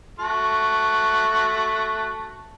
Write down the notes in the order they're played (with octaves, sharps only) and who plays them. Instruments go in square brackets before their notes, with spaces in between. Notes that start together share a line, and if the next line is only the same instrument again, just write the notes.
[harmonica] A3 F#4